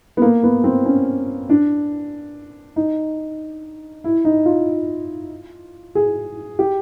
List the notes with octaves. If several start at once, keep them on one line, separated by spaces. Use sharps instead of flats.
B3
A#3
B3
C4
C#4
D4
D#4
E4
D#4
F4
G#4
G4